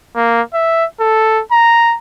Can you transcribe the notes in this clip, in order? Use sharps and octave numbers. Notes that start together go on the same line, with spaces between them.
A#3
E5
A4
A#5